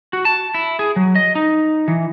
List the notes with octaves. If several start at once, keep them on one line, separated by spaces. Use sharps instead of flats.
F#4
A5
E4
G#4
F#3
D#5
D#4
E3